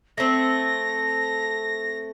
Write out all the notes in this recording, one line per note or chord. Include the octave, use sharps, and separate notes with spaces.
A3 C4 A#6